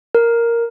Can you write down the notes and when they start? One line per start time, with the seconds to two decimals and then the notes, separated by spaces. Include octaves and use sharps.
0.15 A#4